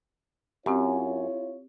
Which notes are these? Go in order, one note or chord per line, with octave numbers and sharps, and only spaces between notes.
F#2 C4 E4 F4 G4 C#5